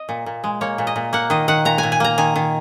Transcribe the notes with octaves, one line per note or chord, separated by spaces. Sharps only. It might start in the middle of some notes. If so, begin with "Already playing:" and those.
Already playing: D#5
A#2
A#2
G#3
A#3 C#5
A#2
D#5
A#2
A#3 F#5
D#3 D#5
D#3 F#5
A#2 A#5
A#2 G#5
G#5
A#3 A#5
D#3 G#5
D#3